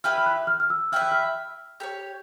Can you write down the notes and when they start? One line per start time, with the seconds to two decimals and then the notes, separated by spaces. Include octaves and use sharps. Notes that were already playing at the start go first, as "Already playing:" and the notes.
0.04 E4 G4 B4 E5 F6
0.18 F6
0.26 F#6
0.47 F6
0.60 F6
0.70 E6
0.92 E4 G4 B4 E5 F6
1.02 F#6
1.12 F6
1.80 G4 A#4 C#5